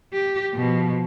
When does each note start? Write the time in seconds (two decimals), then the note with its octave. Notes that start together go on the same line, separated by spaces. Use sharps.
0.13 G4
0.55 B2 F3